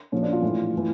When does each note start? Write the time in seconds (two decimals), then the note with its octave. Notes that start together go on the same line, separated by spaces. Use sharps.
0.12 A#2 F3 C#4
0.23 D4
0.33 F4
0.42 A2 E3
0.73 A2 E3